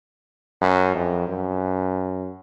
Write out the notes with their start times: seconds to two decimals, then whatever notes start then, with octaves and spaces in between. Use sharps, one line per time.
0.62 F#2
0.96 F2
1.29 F#2